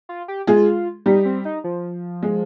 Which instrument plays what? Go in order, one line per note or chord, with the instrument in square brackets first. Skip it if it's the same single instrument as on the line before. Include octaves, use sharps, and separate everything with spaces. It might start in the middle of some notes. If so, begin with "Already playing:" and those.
[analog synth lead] F4
G4
[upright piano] G#3 G#4 [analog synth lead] F4
[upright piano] G3 G4 [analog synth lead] D#4
[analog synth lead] C4
D#4
F3
[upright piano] G#3 G#4